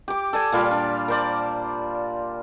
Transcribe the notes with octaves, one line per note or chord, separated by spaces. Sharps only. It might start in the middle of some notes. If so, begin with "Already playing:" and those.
G4 D6
A4 D5 G#5
A#2 G3 F4 D6
D4
A#4 C5 D5